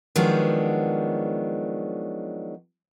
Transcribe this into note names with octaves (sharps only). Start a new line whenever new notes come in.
D#3 F3 F#3 G#3 B3 D4